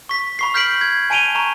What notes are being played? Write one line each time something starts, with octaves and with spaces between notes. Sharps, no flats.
C#6 B6
B5 C#6 C7
F6 G6 B6 C7 D7 F#7
G#6
G#5 A5 D7 D#7 F7 G7
A#5 C#6